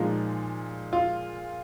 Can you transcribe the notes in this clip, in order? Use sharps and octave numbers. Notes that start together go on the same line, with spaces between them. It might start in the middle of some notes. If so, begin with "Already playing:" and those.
Already playing: A#2 F3 G#3 D#4
F4